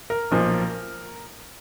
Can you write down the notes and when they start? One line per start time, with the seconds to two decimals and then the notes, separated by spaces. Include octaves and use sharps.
0.10 A#4
0.31 B1 A#2 F3 A#3